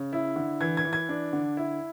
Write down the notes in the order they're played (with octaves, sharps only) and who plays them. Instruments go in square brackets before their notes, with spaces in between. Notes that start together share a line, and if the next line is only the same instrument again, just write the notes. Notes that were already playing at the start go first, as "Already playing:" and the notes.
Already playing: [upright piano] C#3
E4
D3
E3 G#6
G#6
E3
G#6
D4
D3
E4